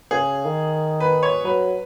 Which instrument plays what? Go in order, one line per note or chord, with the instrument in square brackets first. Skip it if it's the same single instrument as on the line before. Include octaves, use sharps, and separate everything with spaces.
[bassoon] C#3 [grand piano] G#4
[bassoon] D#3
[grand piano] B4
C#5
[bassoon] F#3 [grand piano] B4